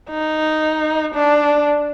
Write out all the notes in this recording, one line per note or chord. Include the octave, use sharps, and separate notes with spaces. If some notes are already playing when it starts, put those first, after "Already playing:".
D#4
D4